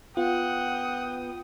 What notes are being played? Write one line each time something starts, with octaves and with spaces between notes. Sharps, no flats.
B3 F4 F#5 G5 D#6